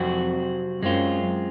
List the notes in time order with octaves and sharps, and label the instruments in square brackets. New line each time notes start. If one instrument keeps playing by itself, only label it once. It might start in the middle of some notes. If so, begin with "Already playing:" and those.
Already playing: [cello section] F2 [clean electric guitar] C3 F#3 C4 F#4
[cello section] F#2 [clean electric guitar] G#3 C4 F4